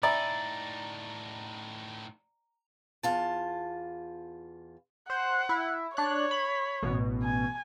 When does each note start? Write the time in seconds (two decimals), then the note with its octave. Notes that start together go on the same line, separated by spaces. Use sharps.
0.03 A2 D#4 D5 E5 G#5 A#5 B5
3.03 E2 F4 A5
5.10 C5 F#5
5.49 E4
5.97 D4 C#5 F#6
6.31 B5
6.83 A1 B2
7.23 G#5